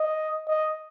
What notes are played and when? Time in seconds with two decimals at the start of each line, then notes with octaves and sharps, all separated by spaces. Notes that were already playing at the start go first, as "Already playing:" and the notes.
Already playing: D#5
0.48 D#5